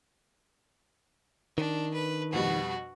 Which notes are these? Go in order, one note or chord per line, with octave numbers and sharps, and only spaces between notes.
D#3 D4
B4
F2 B2 G3 F#4